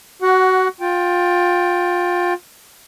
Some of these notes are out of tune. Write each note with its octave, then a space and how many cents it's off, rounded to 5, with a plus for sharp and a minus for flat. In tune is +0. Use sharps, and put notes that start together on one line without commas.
F#4 +20 F#5 +0
F4 +20 G5 +0